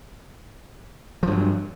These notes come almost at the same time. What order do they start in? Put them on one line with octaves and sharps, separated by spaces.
F3 G2 F#3